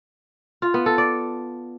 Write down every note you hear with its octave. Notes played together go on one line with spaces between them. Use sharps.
F4
B3
A4
D5